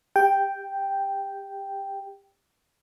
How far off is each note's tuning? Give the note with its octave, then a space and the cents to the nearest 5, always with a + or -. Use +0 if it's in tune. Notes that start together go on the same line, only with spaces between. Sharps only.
G4 +25 G5 +0